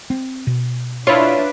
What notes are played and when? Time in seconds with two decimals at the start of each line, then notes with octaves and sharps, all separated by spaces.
0.10 C4
0.47 B2
1.07 D4 E4 F4 B4 C#5